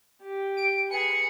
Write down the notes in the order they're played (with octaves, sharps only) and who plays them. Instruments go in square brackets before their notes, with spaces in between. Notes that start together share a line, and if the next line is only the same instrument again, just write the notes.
[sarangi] G4
[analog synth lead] D7
[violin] G#4 [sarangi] B4 [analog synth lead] C#7